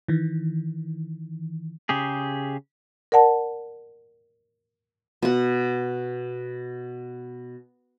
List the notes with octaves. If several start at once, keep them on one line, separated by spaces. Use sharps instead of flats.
D#3 E3
C#3 G4 G#4
A#4 D5 F#5 A5
B2 F#5